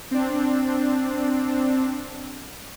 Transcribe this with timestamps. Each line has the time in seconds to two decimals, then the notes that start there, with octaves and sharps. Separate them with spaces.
0.11 C4 D4